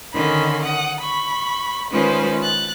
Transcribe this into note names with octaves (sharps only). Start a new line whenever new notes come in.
D3 D#3 C#4 B5 C6
F#5 D#6
B5 C#6
D#3 G#3 C#4 F4 B4 C5
F#6 A6